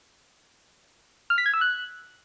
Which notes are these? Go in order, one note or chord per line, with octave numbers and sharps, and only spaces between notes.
F6
B6
G#6
E6
F#6